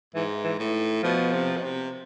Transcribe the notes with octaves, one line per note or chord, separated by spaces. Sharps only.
G#2 E3
E3
A2
B2 F3
C3
B2
C3